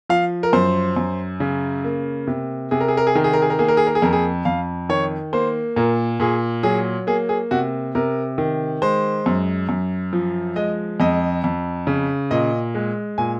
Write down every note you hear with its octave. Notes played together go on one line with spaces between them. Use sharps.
F3 F5
A#4
F#2 C5
F#2
C#3
A#3
C3
C3 G#4
A#4
G#4
A#4
G#4
D#3 A#4
G#4
A#4
G#4
A#4
A#3 G#4
A#4
G#4
A#4
G#4
F2 A#4
G#4
F2 F5
D#3 C#5
A#3 C5
A#2 A#4
A#2 G#4
F#3 G#4
A#3 G#4
G#4
C3 F#4
C3 A#4
D#3
G#3 C5
F#2
F#2
F3
G#3 D#5
F2 D#5
F2
C#3
A#2 D#5
G#3
A#2 G#5